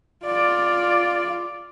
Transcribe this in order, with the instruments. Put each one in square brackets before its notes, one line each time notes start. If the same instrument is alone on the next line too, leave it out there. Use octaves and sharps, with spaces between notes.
[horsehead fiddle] F4 D5